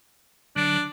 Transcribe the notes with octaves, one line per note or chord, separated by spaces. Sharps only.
D3 F#3 D4